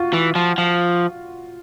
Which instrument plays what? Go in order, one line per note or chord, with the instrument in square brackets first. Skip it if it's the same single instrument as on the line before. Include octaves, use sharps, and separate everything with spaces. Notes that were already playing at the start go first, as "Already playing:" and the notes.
Already playing: [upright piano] F4 F#4
[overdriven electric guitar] E3
F3
F3